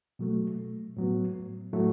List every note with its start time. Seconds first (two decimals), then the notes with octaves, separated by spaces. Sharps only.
0.19 B2 F#3 A3
0.97 A2 F#3 B3
1.73 A2 F#3 A3